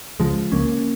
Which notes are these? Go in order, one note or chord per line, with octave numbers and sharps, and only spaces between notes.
C#2 C#3 F3 G#3
C#2 C#3 A#3 C#4